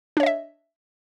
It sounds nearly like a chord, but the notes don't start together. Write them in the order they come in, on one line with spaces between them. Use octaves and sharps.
D4 C#5 D#5 E5